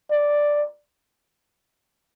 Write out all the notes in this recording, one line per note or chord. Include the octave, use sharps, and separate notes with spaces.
D5